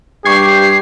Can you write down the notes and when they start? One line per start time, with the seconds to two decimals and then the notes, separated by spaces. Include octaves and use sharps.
0.25 G2 G4 C#6 G#6 C7